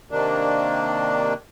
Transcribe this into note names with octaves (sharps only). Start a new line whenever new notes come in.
C3 D#3 A#3 D4